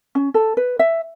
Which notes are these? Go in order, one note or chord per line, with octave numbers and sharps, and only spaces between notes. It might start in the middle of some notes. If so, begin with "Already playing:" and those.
C#4
A4
B4
E5